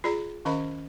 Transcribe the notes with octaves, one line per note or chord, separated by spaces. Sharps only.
F4 G#4 D5 A#5
D#3 C#4 A#4 D#5 F5 B5